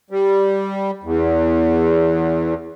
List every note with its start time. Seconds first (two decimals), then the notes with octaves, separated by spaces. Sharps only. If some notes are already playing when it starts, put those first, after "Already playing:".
0.10 G3
1.03 E2